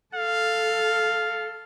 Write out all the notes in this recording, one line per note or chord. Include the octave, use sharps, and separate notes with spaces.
A4 F5